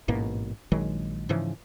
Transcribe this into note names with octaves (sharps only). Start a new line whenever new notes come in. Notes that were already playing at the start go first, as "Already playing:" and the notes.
A1 G#2 B2 A#3
A#1 D#3 F#3 G#3
G#2 C#3 E3 F3